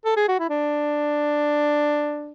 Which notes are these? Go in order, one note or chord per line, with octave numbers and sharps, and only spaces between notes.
A4
G#4
F#4
E4
D4